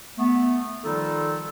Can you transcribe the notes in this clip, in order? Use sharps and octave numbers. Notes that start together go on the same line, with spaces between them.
A3 B3
D#3 F3 G3 D#4 F4 A4